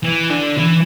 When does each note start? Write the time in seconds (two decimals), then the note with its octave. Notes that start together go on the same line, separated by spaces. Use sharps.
0.04 E3
0.30 D3
0.58 E3